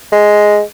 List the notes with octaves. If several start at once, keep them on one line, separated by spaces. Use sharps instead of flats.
G#3